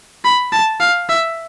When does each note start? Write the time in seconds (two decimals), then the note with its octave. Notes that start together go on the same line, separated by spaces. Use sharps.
0.24 B5
0.53 A5
0.80 F5
1.09 E5